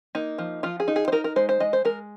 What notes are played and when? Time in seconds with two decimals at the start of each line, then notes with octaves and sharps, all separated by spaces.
0.15 A#3 D#4
0.38 F3
0.63 F3 F4
0.80 G#4
0.88 D#4
0.96 G#4
1.08 C5
1.12 D#4 A#4
1.24 A#4
1.36 G#3 C5
1.49 C5
1.60 G#3 D#5
1.73 C5
1.85 G#3 A#4